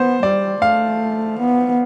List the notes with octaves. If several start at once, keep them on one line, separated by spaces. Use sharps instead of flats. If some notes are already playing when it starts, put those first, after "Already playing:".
Already playing: B3 C5
G3 D5
A3 F5
B3